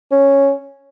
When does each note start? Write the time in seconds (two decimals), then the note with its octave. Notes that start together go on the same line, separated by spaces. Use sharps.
0.11 C#4